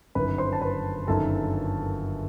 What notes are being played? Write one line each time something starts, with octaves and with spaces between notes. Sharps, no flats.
G1 F#2 D#3 B4 B5
C5 C6
A5
B4 B5
G1 F#2 D#3 A4 A5